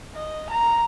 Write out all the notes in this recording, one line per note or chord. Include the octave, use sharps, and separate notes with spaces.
D#5
A#5